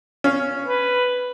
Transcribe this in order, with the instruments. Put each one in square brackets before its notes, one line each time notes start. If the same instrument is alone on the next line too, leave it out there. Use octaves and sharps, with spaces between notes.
[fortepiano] C#4 F5
[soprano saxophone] B4